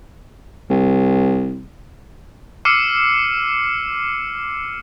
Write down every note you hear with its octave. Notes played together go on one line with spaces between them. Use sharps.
C2
D6 E6 F6 C7 C#7 D#7